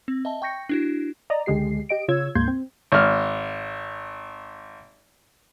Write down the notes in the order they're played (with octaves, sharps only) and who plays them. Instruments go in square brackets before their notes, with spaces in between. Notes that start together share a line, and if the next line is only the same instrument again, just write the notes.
[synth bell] C4
D#5 E5 A5
G5 C#6 G6 A#6 C#7
D4 E4 F#4
[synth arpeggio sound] D5 D#5 A#5
C#2 D3 G#3 G4 C7
G4 D#5 D7
C#3 F4 C#5 E6 G#6
D2 G#2 A#3 C6 G6 G#6
C4
[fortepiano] G#1 F6